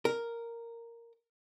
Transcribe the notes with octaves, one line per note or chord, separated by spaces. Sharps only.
A#4